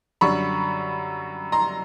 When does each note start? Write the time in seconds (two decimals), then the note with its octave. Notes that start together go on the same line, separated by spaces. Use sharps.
0.21 F#2 D3 G3 B5 C#6
1.52 A#5 C6